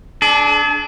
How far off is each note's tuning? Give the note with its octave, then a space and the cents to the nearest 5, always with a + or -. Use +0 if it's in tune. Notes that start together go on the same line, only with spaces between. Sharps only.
D4 +0 G#4 +45